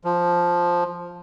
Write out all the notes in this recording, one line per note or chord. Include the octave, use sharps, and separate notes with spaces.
F3